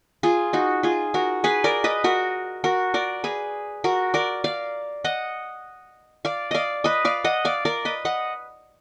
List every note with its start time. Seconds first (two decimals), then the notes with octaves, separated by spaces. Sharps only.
0.23 F4 G#4
0.53 D#4 F#4
0.83 F4 G#4
1.14 F#4 A#4
1.44 G#4 B4
1.64 A#4 D5
1.84 B4 D#5
2.04 F#4 A#4
2.64 F#4 A#4
2.94 A#4 D5
3.24 G#4 B4
3.84 F#4 A#4
4.14 A#4 D5
4.44 D5 F5
5.04 D#5 F#5
6.25 D5 F5
6.51 D5 D#5 F5
6.84 B4 D#5
7.05 D5 F5
7.24 D#5 F#5
7.45 D5 F5
7.65 A#4 D5
7.85 B4 D#5
8.05 D#5 F#5